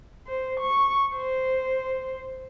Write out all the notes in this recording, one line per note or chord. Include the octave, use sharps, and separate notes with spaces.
C5
C#6
C5